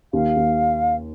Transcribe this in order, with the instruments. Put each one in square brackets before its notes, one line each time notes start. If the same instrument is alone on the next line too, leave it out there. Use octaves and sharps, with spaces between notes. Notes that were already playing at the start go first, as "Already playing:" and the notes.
[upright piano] D#2 [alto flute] F5
[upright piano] D#2